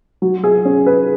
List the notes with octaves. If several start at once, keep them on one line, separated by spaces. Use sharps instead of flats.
F#3
G#4
C#4
B4